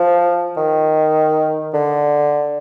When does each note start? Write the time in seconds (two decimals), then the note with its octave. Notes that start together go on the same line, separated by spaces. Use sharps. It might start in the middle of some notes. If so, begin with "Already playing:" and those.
Already playing: F3
0.57 D#3
1.74 D3